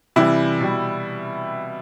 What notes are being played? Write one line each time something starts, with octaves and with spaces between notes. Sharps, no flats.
C3 E3 G3 E4
B2 G3